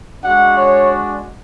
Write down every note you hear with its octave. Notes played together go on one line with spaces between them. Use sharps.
G#3 D4 F#4 F#5
C#5